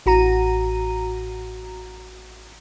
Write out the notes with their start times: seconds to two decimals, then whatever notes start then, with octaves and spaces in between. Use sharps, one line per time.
0.06 A1 F#4 A#5 D#7